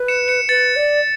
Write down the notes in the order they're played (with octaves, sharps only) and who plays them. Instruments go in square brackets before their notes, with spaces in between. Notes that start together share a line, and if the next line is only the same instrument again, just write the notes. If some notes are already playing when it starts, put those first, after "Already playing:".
Already playing: [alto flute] B4
[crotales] C#7 E7
C#7 E7
[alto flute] B4 [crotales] A6 C#7
[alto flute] D5